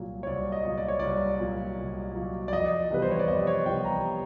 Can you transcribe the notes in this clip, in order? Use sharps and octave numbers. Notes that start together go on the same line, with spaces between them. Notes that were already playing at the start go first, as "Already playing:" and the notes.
Already playing: C2 A#2 F#3
C#5
C2 D5
D#5
A#2 F#3
D5
C#5
C2 D5
A#2 F#3
C2
A#2 F#3
D5
F2 D#5
C3 E3 G3 B3 B4
C5
C#5
D5
F2 D#5
C#5
C3 E3 G3 B3 G5
A#5